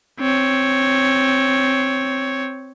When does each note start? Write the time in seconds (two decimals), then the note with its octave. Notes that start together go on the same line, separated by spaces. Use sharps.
0.20 C4 C#5